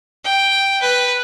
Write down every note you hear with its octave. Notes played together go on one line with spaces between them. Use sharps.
G5
B4